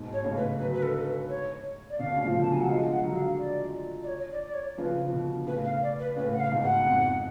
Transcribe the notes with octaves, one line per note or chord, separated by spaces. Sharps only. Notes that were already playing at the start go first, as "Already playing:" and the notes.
Already playing: G#2 B2
C#5
A2 C#3
B4
D3 F#3 B4
B4
A4
A4
B4
C#5
D5
B2 D3 F5
A2 C#3
F3
B2 D3
A5
D3 F#3 G#5
F#5
F3 G#3 F5
F#5
D3 F#3
F5
D5
D5
C#5
D5
D5
C#5
C#3 F3 B4
F3
B2 D3
A2 C#3 B4
F5
D5
B4
A2 C#3 B4
F#5
F5
G#2 B2
F#5
F2 G#2